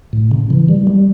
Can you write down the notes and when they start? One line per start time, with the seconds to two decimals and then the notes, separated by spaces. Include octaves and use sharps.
0.13 A2
0.31 C#3
0.50 E3
0.68 G3
0.87 G3